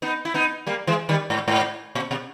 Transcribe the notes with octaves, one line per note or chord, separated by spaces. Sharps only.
B3 D#4
E4
B3 D#4
G3 A#3
E3 G#3
D#3 G3
G#2
G#2
A#2
B2